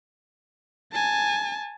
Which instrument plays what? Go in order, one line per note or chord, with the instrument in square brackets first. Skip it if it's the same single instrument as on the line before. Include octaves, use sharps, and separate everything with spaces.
[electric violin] G#5 A5